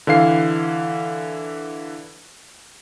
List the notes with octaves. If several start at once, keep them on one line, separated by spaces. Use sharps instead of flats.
D3 E3 F5 C7